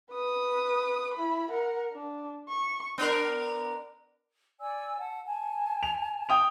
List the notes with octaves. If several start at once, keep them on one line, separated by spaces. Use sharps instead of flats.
B4 D#6
E4 B5
A#4 F#5
D4
C#6
B3 D4 A#4
D5 G#5 E6
F#5 A5
G#5 A5
F7
G5 D#6 F7